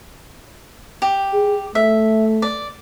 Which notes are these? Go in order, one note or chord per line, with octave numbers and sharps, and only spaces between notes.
G4
G#4
A3 E5
D5